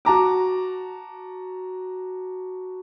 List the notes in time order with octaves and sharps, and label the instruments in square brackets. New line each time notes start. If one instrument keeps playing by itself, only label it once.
[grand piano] F#4 A5 A#5 D6